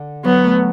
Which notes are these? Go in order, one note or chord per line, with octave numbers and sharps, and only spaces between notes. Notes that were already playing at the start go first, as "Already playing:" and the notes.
Already playing: D3
F#3 B3
A3